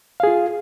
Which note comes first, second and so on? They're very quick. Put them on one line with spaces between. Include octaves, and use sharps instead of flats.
F5 G#4 F4